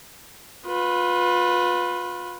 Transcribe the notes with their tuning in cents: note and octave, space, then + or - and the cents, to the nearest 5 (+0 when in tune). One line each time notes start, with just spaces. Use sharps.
F4 +30 B4 +0